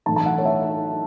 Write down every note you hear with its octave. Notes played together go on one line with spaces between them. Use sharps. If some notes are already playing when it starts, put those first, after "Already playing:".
B1 A2 E3 A5
A5
F#5
C#5
E5